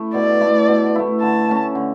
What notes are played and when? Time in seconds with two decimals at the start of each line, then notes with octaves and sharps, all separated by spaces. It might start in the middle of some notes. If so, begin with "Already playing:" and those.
Already playing: A3 E4
0.14 B2 D5
0.41 A3 E4
0.68 B2
0.96 A3 E4
1.21 D3 A5
1.49 A3 C#4
1.75 D3